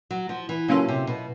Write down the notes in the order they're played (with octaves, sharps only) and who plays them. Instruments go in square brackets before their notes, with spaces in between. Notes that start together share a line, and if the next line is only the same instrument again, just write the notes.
[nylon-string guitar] F#3
F3
E3
[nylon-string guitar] C#3 [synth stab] F#3 A#3 C#4 F4 A4
[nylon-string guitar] C3
B2